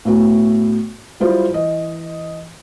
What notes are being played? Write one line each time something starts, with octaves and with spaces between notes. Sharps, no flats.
A2 A3 B3 F#4
F#3 G3 E4 F4 G4 C5
E3 D#5